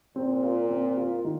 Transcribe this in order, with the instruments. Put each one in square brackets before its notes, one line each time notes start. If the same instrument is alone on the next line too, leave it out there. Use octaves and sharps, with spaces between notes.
[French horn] A#2 [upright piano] C4
[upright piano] F4 A#4
C4
F4 A#4
D#3